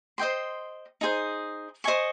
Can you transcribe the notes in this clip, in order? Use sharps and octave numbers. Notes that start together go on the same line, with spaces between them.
C5 D#5 G5 C6
D#4 G#4 C5
C5 D#5 G#5 C#6